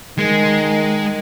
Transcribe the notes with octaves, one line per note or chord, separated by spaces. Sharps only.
D#3 G#3